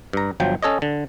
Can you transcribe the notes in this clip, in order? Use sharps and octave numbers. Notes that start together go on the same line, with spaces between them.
G2 A#5
G1 F3 F#3 G5
C#4 A4 C#5 D#5
D3